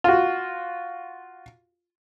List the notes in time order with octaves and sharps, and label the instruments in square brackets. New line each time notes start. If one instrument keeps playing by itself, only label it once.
[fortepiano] F4 F#4